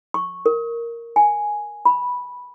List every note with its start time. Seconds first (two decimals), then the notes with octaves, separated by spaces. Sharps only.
0.14 C#6
0.46 A#4
1.16 G#5
1.85 B5